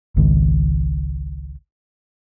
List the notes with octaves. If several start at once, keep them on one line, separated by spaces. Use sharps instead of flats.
G#1 C#2 G#2 D#3